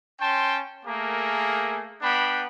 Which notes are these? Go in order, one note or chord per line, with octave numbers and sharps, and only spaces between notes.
C#4 G5 A5 C6
A3 A#3 G#4 A#4
B3 D4 G5 B5